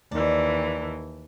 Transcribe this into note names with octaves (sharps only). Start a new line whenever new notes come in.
D#2 E3 D4